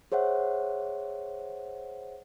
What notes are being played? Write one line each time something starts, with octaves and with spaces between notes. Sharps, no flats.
G#4 C5 C#5 E5 F#5